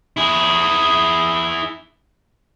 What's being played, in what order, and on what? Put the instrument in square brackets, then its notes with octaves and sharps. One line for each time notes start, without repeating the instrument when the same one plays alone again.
[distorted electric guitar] E4 G#4